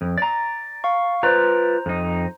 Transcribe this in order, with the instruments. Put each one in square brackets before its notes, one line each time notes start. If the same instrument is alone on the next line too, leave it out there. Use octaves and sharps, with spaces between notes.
[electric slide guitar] F2
[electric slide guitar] D5 A#5 [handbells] A6
[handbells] F5 C#6
[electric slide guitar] F4 B4 D5 [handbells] C5 A#5
[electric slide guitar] F2 D#4